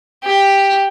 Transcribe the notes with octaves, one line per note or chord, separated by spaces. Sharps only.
G4